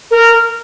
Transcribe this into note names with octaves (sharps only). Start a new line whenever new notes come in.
A#4